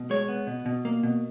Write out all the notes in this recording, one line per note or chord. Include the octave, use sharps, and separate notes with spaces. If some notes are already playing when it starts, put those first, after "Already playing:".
Already playing: B2
G#3 C#5
B3
B2
B2
A#3
B2